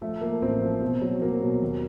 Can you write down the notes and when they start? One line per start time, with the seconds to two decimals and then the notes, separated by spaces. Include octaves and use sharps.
0.01 F3 A3
0.21 F3 A#3
0.42 A1 C4
0.62 F3
0.82 B2
1.02 F#3
1.22 F#3 A#3
1.42 B2
1.61 D#2